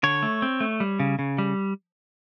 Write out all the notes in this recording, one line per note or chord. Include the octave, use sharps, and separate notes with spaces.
D3 C#5
A3
C4
A3
G3
C#3
C#3
G3